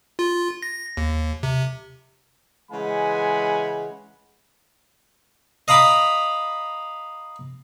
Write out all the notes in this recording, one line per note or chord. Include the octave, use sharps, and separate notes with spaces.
F4
A#6
D#2
C3
C#3 E3 G#3 F#5 G#5 B5
D#5 F5 A#5 B5 D6